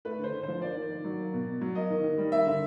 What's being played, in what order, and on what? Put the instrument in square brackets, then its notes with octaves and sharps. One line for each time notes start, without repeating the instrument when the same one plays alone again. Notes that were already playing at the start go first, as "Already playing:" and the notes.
[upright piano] A3 B4
D3 C5
D3
F3 C5
A#3 D5
D#3
D#3
F#3
A#3
B2
B2
F#3
A#3 D#5
D#3
D#3
G3
A#3 E5
D3